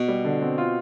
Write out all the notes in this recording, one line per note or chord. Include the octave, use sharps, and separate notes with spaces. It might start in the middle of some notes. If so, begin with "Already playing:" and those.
Already playing: B2
G3
D3
C4
F4